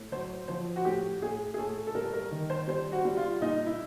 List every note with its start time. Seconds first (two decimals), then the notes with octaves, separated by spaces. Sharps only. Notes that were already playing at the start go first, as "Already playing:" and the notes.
Already playing: A2
0.12 F#3 C5
0.48 F3 C5
0.76 F#4
0.85 A2 G4
1.22 A2 G#4
1.54 G#4
1.58 A2 A4
1.87 A4
1.95 G3 A#4
2.13 A#4
2.31 D#3
2.50 C5
2.67 G3 C5
2.92 F#4
3.05 G3
3.17 F4
3.41 A#2 D#4
3.66 E4